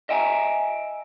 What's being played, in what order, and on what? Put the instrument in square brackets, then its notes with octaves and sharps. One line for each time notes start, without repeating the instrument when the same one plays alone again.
[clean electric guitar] D#5 E5 G5 G#5 A#5